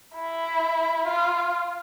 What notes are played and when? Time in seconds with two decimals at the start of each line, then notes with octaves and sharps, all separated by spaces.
0.16 E4
1.07 F4